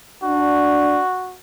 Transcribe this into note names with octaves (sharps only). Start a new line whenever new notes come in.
D4 F#4